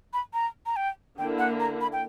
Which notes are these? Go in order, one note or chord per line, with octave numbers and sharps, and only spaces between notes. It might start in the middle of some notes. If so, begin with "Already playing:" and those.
B5
A#5
A#5
G5
D3 A#3 E4 G5
F#5
A#5
B5
G5